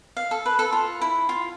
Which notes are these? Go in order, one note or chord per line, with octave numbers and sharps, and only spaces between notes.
F5
A4
B4
A4
F4
E4
F4